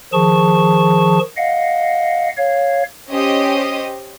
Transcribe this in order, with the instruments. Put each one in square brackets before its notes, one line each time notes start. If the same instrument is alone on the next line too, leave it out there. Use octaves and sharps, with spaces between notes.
[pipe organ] D#3 F3 G#4 A5 C#6
D#5 F5 F#5
C#5 F5
[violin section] C#4 G4 C5 D#5 D#6